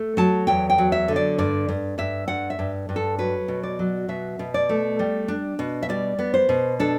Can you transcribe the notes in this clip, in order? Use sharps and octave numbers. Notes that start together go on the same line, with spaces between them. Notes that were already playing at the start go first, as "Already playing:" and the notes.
Already playing: A3
F#3 A5
E2 G5
G5
F#3
E5
D3
D5
G2 D5
G2
G2 E5
G2 F#5
E5
G2
G2
A4
F#3 B4
B2
D5
F#3
B2 E5
B2
D5
A3
G3
D4
B2
E5
G3 D5
B3
C5
B2
D4 A4